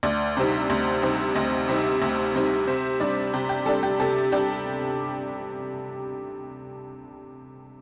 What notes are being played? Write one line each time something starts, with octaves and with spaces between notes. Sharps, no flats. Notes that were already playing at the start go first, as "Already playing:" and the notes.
D2 D5
C3 G3 C4 D#4
D2
C3 G3 C4 D#4
D2 D#5
C3 G3 C4 D#4
D2
C3 G3 C4 D#4
C3 C5
G3 D4 D5
C3 G4
G4
G3 D4 A4
G4
C3 A4
G3 D4 G4